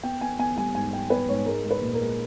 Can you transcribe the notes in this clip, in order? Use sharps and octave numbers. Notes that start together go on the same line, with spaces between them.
B3 G5
B3 G#5
B3 G#5
G3 G#5
G#2 G#5
G3 G5
B3 B4
G#2 C#5
G#3 A#4
G#3
B4
A#2
A#4
G#3